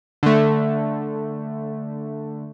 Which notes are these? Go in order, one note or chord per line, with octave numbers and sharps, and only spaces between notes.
D3 A3